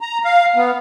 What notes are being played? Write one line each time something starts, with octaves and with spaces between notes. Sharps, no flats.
A#5
F5
B3